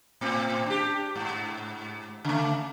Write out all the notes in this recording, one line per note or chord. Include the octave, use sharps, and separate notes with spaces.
A2 C4
D4 G4
G#2
C#3 A3